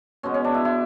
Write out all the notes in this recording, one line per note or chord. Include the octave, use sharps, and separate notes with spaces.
B2 G#3 B3 C#4
C#4
D4
E4
E4